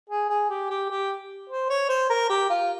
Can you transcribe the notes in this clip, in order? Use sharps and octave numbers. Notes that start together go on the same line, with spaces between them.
G#4
G#4
G4
G4
G4
C5
C#5
C5
A#4
G4
F4